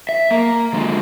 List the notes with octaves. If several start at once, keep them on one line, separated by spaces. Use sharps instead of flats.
E5
A#3
D3 G#3